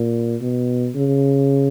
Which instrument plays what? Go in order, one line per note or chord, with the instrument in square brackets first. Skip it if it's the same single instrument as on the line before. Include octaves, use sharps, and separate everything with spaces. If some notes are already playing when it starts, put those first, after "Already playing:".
Already playing: [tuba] A#2
B2
C#3